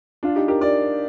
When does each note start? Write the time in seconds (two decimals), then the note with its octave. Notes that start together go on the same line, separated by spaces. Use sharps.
0.23 D4 F4
0.36 D#4 G4
0.48 G4 A#4
0.61 A#4 D5